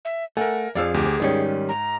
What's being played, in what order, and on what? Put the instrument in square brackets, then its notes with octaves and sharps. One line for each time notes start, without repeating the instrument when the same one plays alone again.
[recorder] E5
[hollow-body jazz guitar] A3 [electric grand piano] A#4 E5 G#5 [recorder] F#5
[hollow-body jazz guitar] F2 F3 [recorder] G#4 [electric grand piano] D5 F5 E6
[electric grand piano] D2 G4
[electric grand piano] G#2 [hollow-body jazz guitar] D#3 G3 C#4
[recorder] A#5